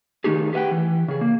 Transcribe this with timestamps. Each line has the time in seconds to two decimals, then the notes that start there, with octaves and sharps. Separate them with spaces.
0.24 D#3 A3 D#4 G4 G#4
0.53 G4 B4 E5 F#5 G5
0.71 E3
1.08 C#3 G#4
1.21 A#3